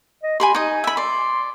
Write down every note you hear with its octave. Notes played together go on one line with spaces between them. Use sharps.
D#5
G4 G#5 B5 C6
D#4 D#5 G#5
E5 B5
D5 C6